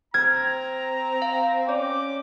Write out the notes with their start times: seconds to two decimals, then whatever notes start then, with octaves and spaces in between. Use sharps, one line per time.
0.14 C4 A#5 F6 G#6
1.22 F5
1.69 C#4 D5 D6